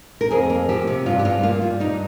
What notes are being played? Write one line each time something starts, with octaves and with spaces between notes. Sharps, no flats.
A#4
F2 G#4
A#3
F3 G4
C3
G2 F4
G4
G2 F4
A#3 F4
G3
G2 D#4